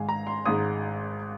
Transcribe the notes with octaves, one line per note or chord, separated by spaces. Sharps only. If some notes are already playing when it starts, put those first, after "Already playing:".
Already playing: G#1 G#2 G#3 F5 G#5
A#5
C6
G#1 G#2 G#3 D#6